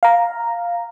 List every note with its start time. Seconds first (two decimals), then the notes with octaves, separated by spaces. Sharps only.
0.03 F5 A#5